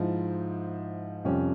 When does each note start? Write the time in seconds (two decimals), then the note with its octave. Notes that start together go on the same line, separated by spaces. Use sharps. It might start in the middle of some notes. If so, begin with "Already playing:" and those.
Already playing: G#2 F3 E4
1.25 F2 C3 G3 C#4